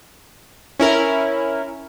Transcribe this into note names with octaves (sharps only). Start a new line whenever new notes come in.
C#4 E4 A#4